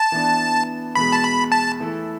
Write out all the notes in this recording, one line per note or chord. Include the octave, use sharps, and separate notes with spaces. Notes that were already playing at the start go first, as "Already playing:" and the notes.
Already playing: A5
E3 B3 D4
E2 B2 G#3 B5
A5
B5
A5
E3 A3 E4 A4